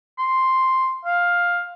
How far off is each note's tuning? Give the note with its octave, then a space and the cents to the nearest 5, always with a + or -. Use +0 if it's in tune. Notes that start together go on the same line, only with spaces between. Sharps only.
C6 +0
F5 +10